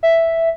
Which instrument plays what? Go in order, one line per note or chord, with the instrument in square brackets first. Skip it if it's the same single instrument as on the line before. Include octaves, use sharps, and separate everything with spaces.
[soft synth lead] E5